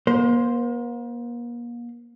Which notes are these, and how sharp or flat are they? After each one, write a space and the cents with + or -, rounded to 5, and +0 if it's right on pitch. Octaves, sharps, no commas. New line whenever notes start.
A#3 +40 C5 +0